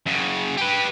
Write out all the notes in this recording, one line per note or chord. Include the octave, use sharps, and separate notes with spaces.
F#2 C#3
G4 B4